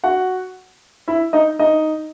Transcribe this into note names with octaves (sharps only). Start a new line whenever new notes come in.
F#4 F#5
E4 E5
D#4 D#5
D#4 D#5